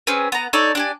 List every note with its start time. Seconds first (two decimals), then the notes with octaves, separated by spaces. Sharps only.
0.07 C4 C#4 G#4 B4
0.32 B3 A#5
0.53 D#4 A4 C#5 D5
0.75 D4 G4 G#5